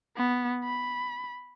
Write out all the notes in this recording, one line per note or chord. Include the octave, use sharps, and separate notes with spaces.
B3
B5